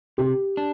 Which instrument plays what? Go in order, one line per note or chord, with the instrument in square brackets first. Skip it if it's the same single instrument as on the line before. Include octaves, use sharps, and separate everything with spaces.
[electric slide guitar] C3 [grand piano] G4
[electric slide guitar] D4